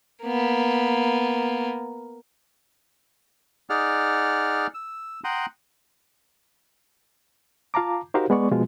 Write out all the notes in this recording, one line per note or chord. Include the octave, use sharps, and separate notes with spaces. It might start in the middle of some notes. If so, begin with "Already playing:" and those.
A#3 B3
D#4 G#4 D5 F#5 F6
E6
F#5 G5 A#5 C6 D#6 F#6
F4 F5 A5 A#5 D6
D#4 F#4 G4 A#4 C5 F5
G#3 B3 D5 C#6
B2 F3 G#3 F4